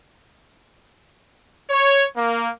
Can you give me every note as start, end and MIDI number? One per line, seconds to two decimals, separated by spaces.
1.70 2.05 73
2.16 2.48 58